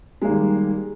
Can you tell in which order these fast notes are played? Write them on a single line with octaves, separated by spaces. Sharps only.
G#3 A#3 D#3 G3